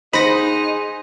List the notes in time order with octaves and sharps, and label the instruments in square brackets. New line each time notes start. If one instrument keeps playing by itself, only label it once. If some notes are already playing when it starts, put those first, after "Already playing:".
[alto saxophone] D#4 [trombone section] G#4 [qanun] C5 F#5 [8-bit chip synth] B5 A#6